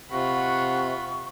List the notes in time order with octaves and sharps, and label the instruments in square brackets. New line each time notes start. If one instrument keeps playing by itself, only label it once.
[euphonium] C3 [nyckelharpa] F4 B5 [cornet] F#5 [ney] C#6